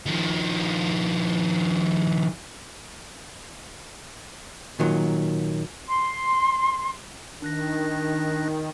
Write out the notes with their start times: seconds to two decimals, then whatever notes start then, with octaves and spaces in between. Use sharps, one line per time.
0.06 D#3 F3
4.79 A#2 D#3 F#3
5.88 C6
7.42 D#3 D4 F#6 A#6